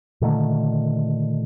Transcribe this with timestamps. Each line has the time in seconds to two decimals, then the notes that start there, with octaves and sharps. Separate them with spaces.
0.21 A#2 D3 D#3 A3